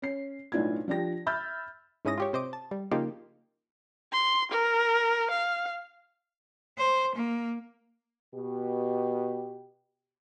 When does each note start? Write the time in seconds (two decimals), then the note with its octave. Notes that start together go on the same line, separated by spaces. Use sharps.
0.02 C#4 C7
0.52 B1 A2 D4 E4 F4 G#6
0.88 F3 D4 G4 A#6
1.26 E5 B5 E6 F6 G6 A6
2.05 G#2 G#3 C#4 E4 D#6 A#6
2.18 F4 G4 C#5
2.33 C3 C5 D#5 D6
2.53 A5
2.71 G3
2.91 C#3 F3 A#3 D#4 F4 G4
4.13 C6
4.52 A#4
5.30 F5
6.78 C5
7.15 A#3
8.34 B2 G4